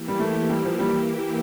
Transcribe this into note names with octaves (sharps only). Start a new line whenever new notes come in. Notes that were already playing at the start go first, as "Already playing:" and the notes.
Already playing: E3 A#3 E4 G4
G3
A3
G3
F3
G3